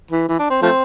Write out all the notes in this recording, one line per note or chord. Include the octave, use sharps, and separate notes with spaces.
E3
E3
D4
C4
F3 A3 C4